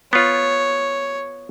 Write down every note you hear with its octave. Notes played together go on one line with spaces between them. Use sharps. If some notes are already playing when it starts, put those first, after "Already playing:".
B3 F4 C#5